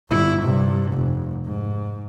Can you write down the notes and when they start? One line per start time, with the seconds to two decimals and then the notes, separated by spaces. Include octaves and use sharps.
0.10 G1 E4
0.42 G2 C3
0.93 F1
1.45 G#2